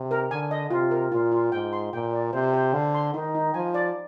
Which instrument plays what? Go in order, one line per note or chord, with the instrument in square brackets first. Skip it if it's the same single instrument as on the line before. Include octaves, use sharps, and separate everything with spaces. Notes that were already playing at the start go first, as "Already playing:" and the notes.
Already playing: [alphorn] C3
[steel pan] A#4
[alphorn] D3 [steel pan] G#5
[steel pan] D#5
[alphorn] C3 [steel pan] F4
[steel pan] A#4
[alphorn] A#2 [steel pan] F4
[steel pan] F4
[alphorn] G#2 [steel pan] G5
[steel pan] C6
[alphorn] A#2 [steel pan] G5
[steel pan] D5
[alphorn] C3 [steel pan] C5
[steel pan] C5
[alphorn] D3 [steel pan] F5
[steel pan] C6
[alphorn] D#3 [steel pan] D#4
[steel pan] D#4
[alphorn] F3 [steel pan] G#5
[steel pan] D5